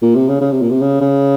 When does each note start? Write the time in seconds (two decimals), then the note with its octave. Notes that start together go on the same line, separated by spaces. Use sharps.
0.02 A#2
0.15 C3
0.28 C#3
0.41 C#3
0.52 C3
0.61 A#2
0.71 C3
0.81 C#3
1.01 C#3